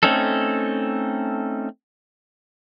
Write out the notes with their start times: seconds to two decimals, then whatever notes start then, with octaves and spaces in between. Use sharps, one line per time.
0.03 A3 C4 C#4 D#4 A4